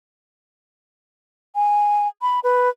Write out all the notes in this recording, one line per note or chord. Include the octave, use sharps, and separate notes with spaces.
G#5
B5
B4